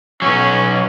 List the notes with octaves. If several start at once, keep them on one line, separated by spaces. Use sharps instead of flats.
B1 F#3 C#4